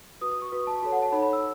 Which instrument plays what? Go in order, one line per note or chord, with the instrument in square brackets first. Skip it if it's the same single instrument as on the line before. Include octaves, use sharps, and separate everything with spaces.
[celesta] F#4 B4 D#6
D#6
C#6
F#4 B4
A5
F#4 A4 C#5 A5
F#5
A5
D#4 A4 C#5 B5
B5
E6